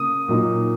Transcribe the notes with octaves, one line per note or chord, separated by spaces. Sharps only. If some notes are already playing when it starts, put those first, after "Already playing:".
Already playing: C#3 A#3 D#6
A#2 F#3 A#3 D#4